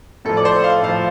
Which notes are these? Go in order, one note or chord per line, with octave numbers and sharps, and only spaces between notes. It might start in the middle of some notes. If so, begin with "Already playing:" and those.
A2 F3 A4
D5
C5
F5
A2 F3 F5